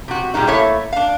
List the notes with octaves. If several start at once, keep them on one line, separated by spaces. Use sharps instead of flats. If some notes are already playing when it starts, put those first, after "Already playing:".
C3 F#4
A#2 G3 G#3 D#4
A3 A#3 E4 C#5
D4 F5